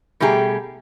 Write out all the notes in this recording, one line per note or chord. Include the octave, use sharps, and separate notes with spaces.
B2 G3 A3 G4 G#4 A#5